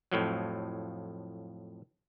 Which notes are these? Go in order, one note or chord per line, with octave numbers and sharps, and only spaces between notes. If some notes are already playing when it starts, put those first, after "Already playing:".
F2 A2 F3 F#3